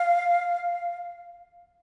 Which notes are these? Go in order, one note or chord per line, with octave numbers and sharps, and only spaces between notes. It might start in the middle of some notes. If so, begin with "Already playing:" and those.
Already playing: F5